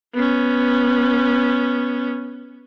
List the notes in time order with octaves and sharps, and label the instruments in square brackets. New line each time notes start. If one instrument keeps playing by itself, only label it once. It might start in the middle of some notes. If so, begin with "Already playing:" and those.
[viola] B3 C#4